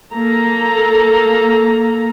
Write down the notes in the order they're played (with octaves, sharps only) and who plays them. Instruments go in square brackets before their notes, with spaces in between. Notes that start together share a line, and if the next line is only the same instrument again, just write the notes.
[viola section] A#3 A4 A#5